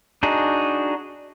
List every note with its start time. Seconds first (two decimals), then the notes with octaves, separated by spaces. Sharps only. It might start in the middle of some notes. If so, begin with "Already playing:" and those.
0.23 D4 D#4 F#4 G#4